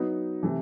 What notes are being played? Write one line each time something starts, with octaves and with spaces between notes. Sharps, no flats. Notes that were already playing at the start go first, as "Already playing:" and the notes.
Already playing: F#3 B3 D#4
C3 E3 A3